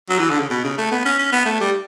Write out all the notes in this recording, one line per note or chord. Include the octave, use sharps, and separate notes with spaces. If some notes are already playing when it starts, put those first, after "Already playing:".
F#3
E3
D3
C#3
B2
C#3
A3
B3
C#4
C#4
B3
A3
G3